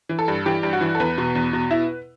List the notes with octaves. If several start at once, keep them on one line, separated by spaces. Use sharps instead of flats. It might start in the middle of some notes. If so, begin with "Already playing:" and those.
E3
A4
G2
E3 G4
G2
F#4
E3
A4
E2 B4
B2
E2
B2
E4